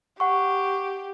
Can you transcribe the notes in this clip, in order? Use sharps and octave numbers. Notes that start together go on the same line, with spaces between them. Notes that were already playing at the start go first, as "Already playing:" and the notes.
G4 F#5 C#6